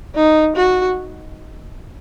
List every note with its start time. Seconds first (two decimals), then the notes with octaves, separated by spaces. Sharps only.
0.15 D#4
0.56 F#4